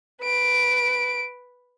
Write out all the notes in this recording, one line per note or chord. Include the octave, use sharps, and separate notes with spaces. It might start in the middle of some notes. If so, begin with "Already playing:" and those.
B4 D7